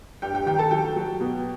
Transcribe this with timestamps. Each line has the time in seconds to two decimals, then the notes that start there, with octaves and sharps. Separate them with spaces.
0.22 G2 G4 G5
0.34 G4 G5
0.46 D#3 G4 G5
0.59 A4 A5
0.71 F#3 G4 G5
0.96 F#3
1.20 B2